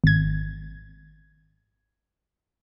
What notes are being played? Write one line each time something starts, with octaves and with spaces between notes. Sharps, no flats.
G#1 G#6